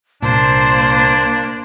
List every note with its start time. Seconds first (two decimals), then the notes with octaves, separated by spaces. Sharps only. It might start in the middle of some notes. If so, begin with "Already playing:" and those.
0.22 C2 A#2 A#3 D4 C5